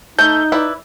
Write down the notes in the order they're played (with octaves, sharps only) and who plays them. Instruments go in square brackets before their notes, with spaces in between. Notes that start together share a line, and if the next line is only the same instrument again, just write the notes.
[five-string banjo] A3 A5 [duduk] D#4 [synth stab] G6
[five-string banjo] E4 B4 D5